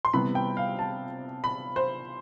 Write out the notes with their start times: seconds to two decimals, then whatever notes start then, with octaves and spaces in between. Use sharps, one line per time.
0.05 C6
0.13 C3 E3 G3 B3 B5
0.35 G5
0.57 F5
0.79 A5
1.44 B5
1.76 C5